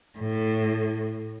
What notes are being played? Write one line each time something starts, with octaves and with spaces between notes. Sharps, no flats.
A2